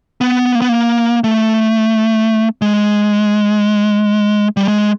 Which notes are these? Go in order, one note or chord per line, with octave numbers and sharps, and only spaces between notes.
B3
A#3
B3
A#3
A3
G#3
G3
G#3